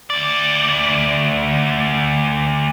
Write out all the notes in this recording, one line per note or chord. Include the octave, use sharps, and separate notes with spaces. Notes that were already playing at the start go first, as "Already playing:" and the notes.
D2 D5